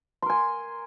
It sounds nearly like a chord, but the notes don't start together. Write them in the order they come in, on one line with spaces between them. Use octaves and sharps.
C6 A#4 G#5